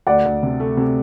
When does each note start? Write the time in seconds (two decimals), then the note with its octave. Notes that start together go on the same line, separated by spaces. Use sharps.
0.07 D2 D5 F#5
0.25 D2
0.43 C3
0.60 A3
0.77 C3